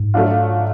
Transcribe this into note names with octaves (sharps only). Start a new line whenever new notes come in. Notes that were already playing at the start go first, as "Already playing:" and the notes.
Already playing: G#2
F#3 A3 D4 F4